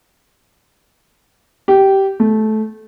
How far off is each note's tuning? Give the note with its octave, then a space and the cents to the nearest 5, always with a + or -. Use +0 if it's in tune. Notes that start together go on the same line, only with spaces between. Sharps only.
G4 -15
A3 -20